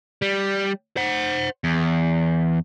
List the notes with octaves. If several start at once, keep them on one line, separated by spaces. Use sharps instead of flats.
G3
C5 F#5
E2